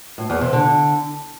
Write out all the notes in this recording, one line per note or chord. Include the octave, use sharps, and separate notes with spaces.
A2
E2
C3
D3